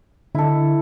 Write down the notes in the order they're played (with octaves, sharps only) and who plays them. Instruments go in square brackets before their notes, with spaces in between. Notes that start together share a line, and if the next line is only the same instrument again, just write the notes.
[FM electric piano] D3 [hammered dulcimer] E4 A4